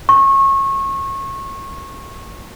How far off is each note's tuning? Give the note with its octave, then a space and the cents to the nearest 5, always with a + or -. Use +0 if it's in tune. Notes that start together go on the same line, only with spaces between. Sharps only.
C#6 -25